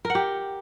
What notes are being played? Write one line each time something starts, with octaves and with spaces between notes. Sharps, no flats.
A#4
F#5
G4